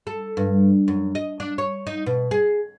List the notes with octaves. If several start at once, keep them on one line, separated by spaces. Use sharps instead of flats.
A4
G2
F#2
D#5
D4
C#5
D#4
B2
G#4